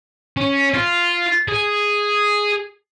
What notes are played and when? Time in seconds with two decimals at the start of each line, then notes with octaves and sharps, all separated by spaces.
0.37 C#4
0.74 F4
1.48 G#4